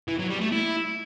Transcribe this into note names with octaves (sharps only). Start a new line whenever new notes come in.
E3
F#3
G3
A3
E4